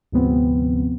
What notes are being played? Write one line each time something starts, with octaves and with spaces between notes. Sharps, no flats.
D2 G#2 C3 F3 B3 C4